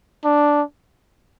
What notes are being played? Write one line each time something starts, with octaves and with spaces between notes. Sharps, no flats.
D4